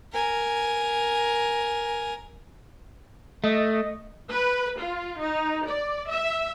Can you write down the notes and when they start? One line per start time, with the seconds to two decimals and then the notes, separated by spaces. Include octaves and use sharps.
0.13 A#4 G#5
3.44 A3 D#5
4.32 B4
4.80 F4
5.20 D#4
5.65 D5
6.07 E5